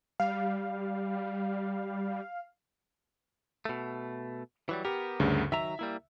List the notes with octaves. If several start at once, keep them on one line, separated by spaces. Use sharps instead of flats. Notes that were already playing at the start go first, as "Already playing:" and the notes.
G3 F5
B2 A3
E3 F#3 G3
B3 G4 A#4
D2 G2 C#3
D#3 F#3 E5 A#5
G3 A#3 E4